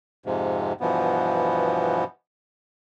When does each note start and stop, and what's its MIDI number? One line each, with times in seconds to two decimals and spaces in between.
0.26 0.73 41
0.26 0.73 44
0.26 0.73 48
0.81 2.04 43
0.81 2.04 47
0.81 2.04 52
0.81 2.04 53
0.81 2.04 59